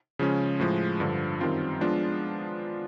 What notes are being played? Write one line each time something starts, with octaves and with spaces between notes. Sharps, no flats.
C#3 F3 G#3 C#4
A2 F3 G#3
G2 D3 F3
F#2 D#3 G3 C4 F4
F3 G#3 B3 D4 F4